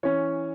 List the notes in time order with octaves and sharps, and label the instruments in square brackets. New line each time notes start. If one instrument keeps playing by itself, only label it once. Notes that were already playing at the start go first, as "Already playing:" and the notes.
[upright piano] E3 C#4 C#5